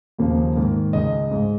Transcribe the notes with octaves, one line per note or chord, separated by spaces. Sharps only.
D#2 C#3 F3 A#3
G#2 D#3 A#3
C#2 C#3 G#3 D#5
G#2 G#3